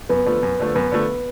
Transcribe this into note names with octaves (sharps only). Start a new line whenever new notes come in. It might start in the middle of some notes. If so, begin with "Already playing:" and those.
F#2 B3
D3 F3 A3
F#2
D3 F3 A3
F#2 B3
D3 F3 A3